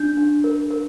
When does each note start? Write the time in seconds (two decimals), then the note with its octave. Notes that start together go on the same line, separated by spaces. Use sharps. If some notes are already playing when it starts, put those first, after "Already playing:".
Already playing: D4 G6
0.17 D4
0.44 A#4
0.70 A#4